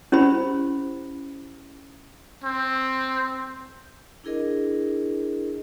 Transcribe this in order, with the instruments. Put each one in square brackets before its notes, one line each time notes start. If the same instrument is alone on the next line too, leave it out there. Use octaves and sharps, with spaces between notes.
[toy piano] C#4 E4 G4 C5 B5
[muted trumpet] C4
[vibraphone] D4 E4 G#4 A#4 D#5